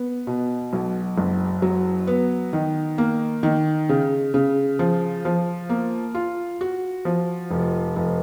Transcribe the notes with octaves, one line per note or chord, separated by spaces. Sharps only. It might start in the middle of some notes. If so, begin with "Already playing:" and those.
Already playing: B3
B2
B1
F#1
F#3
B3
D#3
A#3
D#3
C#3
C#3
F3
F3
A#3
F4
F#4
F3
F1
F1